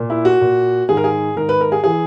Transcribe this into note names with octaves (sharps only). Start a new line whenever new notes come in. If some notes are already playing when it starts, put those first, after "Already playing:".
Already playing: A#2
E4
F#4
A#2
G#2 D#3 G#4
A#4
G#4
G#2 D#3 A#4
B4
A#4
G#4
E3 G#4